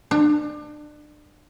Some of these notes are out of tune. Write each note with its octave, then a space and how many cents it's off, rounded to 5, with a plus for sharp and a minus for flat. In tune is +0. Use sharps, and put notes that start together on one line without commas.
D4 +30